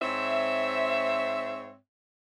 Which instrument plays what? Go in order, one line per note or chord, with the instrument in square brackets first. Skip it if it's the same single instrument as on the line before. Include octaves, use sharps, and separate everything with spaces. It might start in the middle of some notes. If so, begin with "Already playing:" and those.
[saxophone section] G#2 C4 C#5 E5